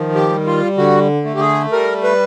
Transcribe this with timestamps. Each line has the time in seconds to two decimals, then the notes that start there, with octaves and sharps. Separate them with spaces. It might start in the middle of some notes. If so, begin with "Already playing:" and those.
Already playing: D#3 F3
0.15 G4
0.30 G3
0.46 F4
0.77 D3 F#4
1.25 A3
1.34 G4
1.40 G#4
1.72 G3 A#4
2.03 B4